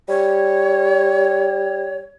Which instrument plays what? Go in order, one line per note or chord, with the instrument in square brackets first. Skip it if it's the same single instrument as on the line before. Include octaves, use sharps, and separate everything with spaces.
[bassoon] G3 [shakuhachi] C#5